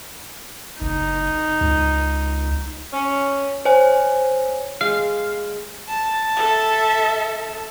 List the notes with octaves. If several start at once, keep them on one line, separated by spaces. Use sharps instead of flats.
F#1 D#4
C#2
C#4
C5 C#5 G#5
G#3 F5
A5
A4 E5